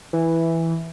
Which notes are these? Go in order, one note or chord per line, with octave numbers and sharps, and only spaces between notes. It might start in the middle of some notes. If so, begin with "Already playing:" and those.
E3